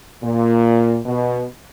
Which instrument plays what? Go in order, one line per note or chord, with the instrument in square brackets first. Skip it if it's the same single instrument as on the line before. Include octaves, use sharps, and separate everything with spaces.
[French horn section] A#2
B2